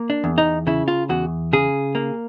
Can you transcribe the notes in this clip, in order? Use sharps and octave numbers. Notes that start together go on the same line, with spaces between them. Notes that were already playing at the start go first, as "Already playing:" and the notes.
Already playing: A#3
D4
E2
D#4
C#3 E4
F4
E2 F#4
C#3 G#4
A#3